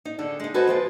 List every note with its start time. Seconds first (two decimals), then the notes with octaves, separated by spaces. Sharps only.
0.05 D#4
0.19 D3 G#4 A4
0.40 G#3 D#4
0.54 F#4 A4 B4 C5 D#5 G#5
0.67 F3 G#3 F4